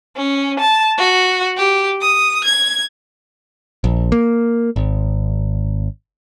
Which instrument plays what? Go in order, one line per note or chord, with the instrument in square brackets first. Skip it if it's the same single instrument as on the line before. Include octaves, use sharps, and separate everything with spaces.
[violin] C#4
A5
F#4
G4
D#6
G#6
[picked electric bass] A#1
A#3
G#1